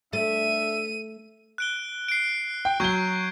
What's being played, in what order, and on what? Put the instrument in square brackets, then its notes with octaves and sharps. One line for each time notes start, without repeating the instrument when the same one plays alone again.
[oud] A3 [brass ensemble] D4 E5 [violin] D#7
[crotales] F#6 D7 G7
C7 D7
[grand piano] G5
[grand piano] F#3 G7 [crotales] C#6 G6 G#6